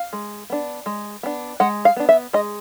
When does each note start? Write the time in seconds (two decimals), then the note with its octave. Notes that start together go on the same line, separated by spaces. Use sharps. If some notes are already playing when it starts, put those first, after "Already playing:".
Already playing: F5
0.13 G#3
0.50 B3 D4
0.86 G#3
1.23 B3 D4
1.60 G#3 F#5
1.85 F5
1.96 B3 D4
2.09 E5
2.33 G#3 D#5